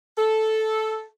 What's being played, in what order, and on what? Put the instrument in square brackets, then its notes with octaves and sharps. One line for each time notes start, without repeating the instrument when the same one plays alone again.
[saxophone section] A4